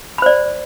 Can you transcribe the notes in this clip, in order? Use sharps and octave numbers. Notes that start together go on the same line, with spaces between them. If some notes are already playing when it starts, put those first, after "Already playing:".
C5 D5 B5